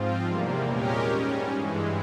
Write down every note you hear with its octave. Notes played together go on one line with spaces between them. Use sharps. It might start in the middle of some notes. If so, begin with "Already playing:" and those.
Already playing: G#2 F3 C4 F4
E2 C3 G3 A#3
A#2 G#3 C#4 G4 A#4
G#2 G3 C#4
G2 E3 G#3